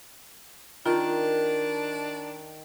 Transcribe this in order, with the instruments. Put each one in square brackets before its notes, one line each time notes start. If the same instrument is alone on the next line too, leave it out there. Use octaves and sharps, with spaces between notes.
[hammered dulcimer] D#3 [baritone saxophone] D4 [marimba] F4